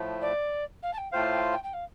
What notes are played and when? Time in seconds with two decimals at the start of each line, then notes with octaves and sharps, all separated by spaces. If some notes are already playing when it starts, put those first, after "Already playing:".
Already playing: A2 F3 A3
0.21 D5
0.82 F5
0.93 A5
0.97 G5
1.12 A2 A3 F4 C5 F5 G5
1.23 A5
1.32 G5
1.52 G5
1.63 G5
1.73 F5